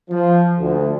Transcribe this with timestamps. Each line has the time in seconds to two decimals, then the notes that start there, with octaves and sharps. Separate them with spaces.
0.10 F3
0.59 D2